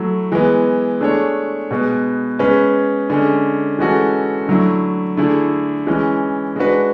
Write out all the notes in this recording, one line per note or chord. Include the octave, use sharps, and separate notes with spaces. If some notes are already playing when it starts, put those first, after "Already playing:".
Already playing: F#3 A3 E4
E3 G#3 B3
A3 D4 G#4 C#5
B2 G#3 B3
G#3 C#4 G#4 B4
D3 G#3 C#4
E3 G#3 C#4 F#4 A4
D3 F#3 A3 E4
D3 A3 E4 G#4
E3 G#3 C#4
G#3 D4 F#4 B4